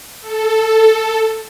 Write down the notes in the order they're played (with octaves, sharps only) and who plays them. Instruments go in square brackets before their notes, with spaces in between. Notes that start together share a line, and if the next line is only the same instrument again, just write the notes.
[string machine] A4